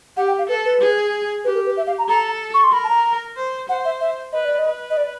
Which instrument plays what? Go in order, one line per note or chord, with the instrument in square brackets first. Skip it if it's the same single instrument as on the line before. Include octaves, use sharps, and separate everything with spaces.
[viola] G4 [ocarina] F#5
[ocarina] G5
F5
[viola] A4 [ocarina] B4
[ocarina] B4
[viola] G#4
[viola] G4 [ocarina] B4
[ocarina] A#4
B4
E5
F5
A#5
[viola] A4 [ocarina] A#5
[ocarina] C#6
C6
[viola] A#4 [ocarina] B5
[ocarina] A5
A#5
[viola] C5
[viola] C5 [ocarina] F#5
[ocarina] E5
E5
[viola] B4 [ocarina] D#5
[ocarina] D5
D#5
[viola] B4
[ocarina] D#5
D5